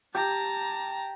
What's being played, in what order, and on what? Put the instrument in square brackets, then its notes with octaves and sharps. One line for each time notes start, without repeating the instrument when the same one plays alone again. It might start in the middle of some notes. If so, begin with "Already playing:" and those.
[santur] G4 [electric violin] A5 A#5